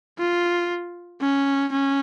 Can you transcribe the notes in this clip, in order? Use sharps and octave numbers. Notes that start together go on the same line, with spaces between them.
F4
C#4
C#4